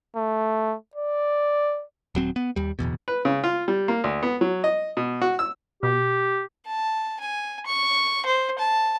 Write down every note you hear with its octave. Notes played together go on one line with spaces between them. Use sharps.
A3
D5
D#1 F#3 C4
B3
D#2 G3
D1 A#1 E2 B2
B4
C#3
F4
G3
A#3
D2
B3
F#3
D#5
B2
F#4
E6
B2 G4
A5
G#5
C#6
C5
A5